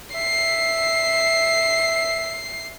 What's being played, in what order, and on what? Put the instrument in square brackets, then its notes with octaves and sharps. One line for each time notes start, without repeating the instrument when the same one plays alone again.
[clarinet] E5 [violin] C7